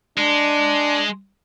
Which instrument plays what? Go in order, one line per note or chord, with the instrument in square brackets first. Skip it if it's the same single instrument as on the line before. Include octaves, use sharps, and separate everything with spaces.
[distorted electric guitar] G#3 [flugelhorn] D4